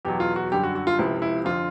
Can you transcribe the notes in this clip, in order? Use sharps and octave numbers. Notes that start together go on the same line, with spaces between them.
E2 B2 F#3 G4
F4
F#4
F#2 D3 G3 G4
F#4
F#4
F4
C#2 C3 F3 E4
E4
F2 D3 F3 F4